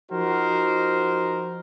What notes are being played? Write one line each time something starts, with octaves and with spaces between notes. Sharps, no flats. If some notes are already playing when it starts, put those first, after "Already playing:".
F3 D#4 F#4 A#4 C5